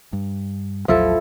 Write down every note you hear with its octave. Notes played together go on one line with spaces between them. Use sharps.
G2
A1 D#2 F3 F#3 E4 A4